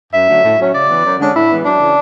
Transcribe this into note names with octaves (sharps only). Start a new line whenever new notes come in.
F#2 E5
D3 F#3 A3 C#4
A2
F#3 C#4
C#3 D5
E3 B3
F#2
D3 G#3 C#4 D4
A2 E4
E3 G#3 B3
F#2 D4
C#3 E3